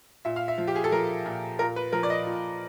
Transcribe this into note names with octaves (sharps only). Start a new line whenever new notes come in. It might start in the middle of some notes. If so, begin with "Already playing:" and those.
A#2 E5
F5
E5
F3
G4
G#4
A4
F3 A#4
A#2
A#2 A#4
B4
F3 A#4
D5
D#5
A#2